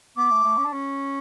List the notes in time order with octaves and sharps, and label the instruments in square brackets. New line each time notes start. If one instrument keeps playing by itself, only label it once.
[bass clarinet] B3 [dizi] D6
[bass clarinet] A3
A3
C#4
D4
C#4